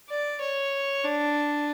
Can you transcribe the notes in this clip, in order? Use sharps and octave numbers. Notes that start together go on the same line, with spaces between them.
D5
C#5
D4